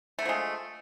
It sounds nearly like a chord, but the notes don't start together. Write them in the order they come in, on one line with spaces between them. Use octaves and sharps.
A3 D3 F3 G#3